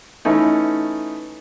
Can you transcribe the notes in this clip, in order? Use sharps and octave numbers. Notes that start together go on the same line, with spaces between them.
E3 A3 C#4 D#4